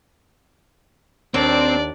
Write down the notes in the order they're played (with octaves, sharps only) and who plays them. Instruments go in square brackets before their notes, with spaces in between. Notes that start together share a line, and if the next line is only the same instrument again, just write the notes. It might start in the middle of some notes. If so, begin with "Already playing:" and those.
[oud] D#2 [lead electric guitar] C4 [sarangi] D4 [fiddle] D5